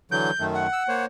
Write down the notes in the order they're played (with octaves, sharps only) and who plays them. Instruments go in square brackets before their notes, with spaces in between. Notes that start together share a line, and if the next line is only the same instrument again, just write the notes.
[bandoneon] D3 E3 F#3 [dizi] G6
[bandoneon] F#2 D#3 A3
[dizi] F#5
[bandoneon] E6
A#3 C5 C#5